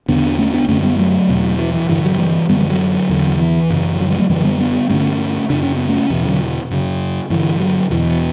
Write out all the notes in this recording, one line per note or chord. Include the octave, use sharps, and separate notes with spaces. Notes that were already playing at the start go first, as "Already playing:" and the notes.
E2 D3 B3 D4
A3 C#4
B3 D4
F#2 D3 A3 C#4
G3 B3
F#3 A3
E2 B2
E3
E3
G2 D3 E3
D3 F#3
E3 G3
F#2 D3 G3 B3
E3 G3
D3 F#3
E2 D3
D3
E3
F#2 C#3
D3 F#3
E3 G3
F#3 A3
F#2 D3 E3 G3
G3 B3
G3 B3
G2 D3 A3 C#4
F#2 C#3 D4
C#4
B3
A3 C#4
E2 B2 E3
D3 F#3
F#2 C#3
G2 D3 E3
D3 F#3
E2 B2 E3